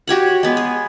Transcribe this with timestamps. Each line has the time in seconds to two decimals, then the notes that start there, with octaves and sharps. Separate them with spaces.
0.07 F#4 G4 C#5 F#5
0.43 G#3 B3
0.57 G#4